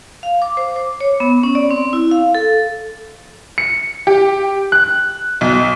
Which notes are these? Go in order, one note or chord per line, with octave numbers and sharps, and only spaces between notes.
F5
D6
C5
D6
C#5
B3
C#4
D5
C4
E4
F5
A4
C#7
G4
F#6
B1